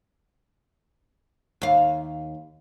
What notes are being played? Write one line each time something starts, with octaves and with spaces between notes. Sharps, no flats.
D#2 F5